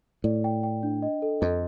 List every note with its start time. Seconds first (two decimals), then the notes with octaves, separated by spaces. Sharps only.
0.24 A2 D5
0.44 G5
0.63 G5
0.83 D4
1.02 D#5
1.22 A4
1.41 F2 D#5